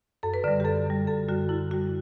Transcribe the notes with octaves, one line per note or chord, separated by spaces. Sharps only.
F#2 A4
B4
D3 G3 D5
G4
F#2 A4
D3 G3
F#2 A4
D3 G3 F#4
F#2 E4
D3 G3 F#4